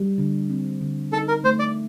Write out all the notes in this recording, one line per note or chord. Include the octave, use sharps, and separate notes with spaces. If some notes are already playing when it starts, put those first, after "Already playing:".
Already playing: G3
D3
C4
D3
D#4 A4
A#4
A3 C5
D5